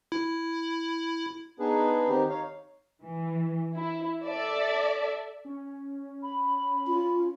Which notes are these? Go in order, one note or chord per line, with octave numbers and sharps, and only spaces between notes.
E4
B3 D4 D#4 G#4 B4
D#3 C4 D#4 G4
D#4 C#5 F5
E3
E4
A4 D5 E5
C#4
B5
F4